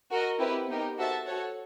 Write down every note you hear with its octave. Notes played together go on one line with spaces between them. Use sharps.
F#4 A#4 D#5
C4 E4 G4 B4
B3 D#4 G4 A#4
F#4 A4 C5 E5 A5
F#4 A4 C#5 F#5